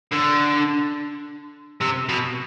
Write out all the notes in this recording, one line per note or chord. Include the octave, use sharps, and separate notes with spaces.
D3
C3
B2